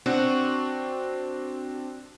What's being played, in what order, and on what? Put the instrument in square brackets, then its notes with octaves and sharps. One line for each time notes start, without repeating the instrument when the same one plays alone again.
[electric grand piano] C4 D4 [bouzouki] F#4